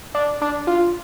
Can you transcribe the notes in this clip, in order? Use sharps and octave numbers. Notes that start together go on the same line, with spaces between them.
D4
D4
F4